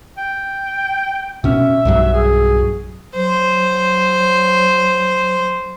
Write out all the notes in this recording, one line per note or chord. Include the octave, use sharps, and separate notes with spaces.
G5
B2 C#4 E5
B1 G2 F#3
G#4
F#3 C5